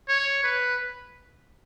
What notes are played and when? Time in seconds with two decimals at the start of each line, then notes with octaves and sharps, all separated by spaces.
0.08 C#5
0.43 B4